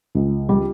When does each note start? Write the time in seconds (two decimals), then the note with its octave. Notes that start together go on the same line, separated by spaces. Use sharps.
0.15 C#2
0.49 G3